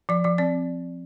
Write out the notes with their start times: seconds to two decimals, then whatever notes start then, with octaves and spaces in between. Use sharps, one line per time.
0.09 F3 D5
0.24 F3 D5
0.38 C4 D5